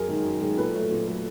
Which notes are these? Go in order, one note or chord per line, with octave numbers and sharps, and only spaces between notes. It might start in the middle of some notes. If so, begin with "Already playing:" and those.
Already playing: F#2 G#4 A#4
D#3 G#3
F#2
D#3 G#3
A#2 A4 B4
F#3 A3
A#2
F#3 A3